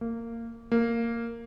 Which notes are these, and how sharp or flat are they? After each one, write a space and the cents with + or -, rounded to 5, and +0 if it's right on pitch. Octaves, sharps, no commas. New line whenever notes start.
A#3 -20
A#3 -10